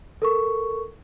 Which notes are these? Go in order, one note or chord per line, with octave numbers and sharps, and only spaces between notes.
A4 A#4 C#6